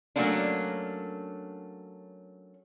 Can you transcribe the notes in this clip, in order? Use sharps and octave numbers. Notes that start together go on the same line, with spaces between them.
F#3 A3 A#3 C#4 D4